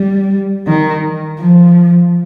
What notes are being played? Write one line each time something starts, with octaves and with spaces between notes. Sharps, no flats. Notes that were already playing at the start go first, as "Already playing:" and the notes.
Already playing: G3
D#3
F3